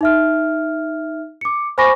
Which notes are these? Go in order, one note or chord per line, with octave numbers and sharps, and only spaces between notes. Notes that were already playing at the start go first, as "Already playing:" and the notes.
D#4 E5 F6
D6 C#7
C5 G#5 B5 C#6 D6 A#6